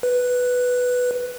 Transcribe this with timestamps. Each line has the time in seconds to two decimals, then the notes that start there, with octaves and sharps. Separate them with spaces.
0.03 B4